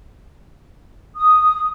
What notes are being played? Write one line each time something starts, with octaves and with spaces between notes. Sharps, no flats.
D#6